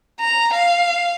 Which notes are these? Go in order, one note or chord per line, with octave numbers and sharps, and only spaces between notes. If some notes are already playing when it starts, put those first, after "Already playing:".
A#5
F5